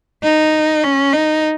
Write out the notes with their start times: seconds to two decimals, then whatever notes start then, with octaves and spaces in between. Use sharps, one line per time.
0.23 D#4
0.84 C#4
1.13 D#4